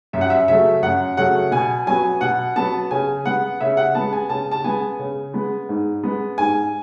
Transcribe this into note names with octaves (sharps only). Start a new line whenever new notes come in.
F#2 E5
F#5
E5
C#3 F#3 A3 E5
F#2 F#5
C#3 F#3 A3 F#5
B2 G#5
F#3 B3 G#5
B2 F#5
F#3 B3 A5
C#3 G#5
G#3 B3 F#5
C#3 E5
F#5
G#3 B3 A5
G#5
C#3 A5
A5
G#3 B3 G#5
C#3
G#3 B3
G#2
G#3 B3
G#2 G#5